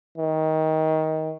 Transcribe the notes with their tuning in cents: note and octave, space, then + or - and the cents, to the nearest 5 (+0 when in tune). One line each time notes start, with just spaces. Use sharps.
D#3 +20